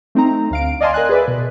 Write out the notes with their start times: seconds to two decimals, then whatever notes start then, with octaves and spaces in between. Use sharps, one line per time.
0.15 A3 C4 D#4 A#5
0.51 D2 F5 D7
0.80 D5 D#5 F5 G#5 A5 C6
0.94 A#4 D#5 G#5 F#6
1.09 G#4 B4 D5 E5
1.28 B2